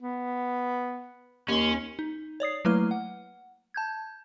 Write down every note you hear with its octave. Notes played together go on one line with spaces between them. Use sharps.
B3
D#2 C#4 C6
D#4
C#5 D5 D#6 C7
F#3 A3 A#3 E4 B4 F6
F#5
A5 G6 G#6